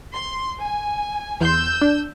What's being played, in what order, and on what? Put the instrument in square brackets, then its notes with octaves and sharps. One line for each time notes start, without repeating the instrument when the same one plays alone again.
[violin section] C6
G#5
[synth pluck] E2 C6 [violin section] E6 G6
[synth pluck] D4